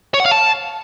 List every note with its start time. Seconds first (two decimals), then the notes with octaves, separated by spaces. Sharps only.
0.14 C#5
0.20 F#5
0.26 F5
0.31 A5